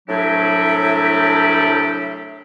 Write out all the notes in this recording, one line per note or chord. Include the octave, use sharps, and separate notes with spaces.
C2 A2 F#3 D4 G4 E5